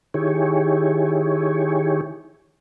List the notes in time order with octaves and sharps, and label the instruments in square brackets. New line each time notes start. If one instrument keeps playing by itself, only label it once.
[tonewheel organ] D#3 E4 G4 G#4 C#5